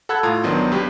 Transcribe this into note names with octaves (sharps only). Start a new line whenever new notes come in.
A4 F#5 B5 E6 F#6 G#6
A2 F4 A#5 D#6 G#6
G1 D#3 F#3 B3 D4 C6
G2 B3 G4